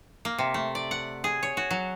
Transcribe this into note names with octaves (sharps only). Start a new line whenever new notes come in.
A#3
C3
A3
D5
F#5
G#4
C#5
F#4
F#3